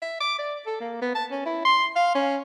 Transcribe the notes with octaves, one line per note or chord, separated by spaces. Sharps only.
E5
D6
D5
A4
A#3
B3
A5
C#4
E4
C6
F5
C#4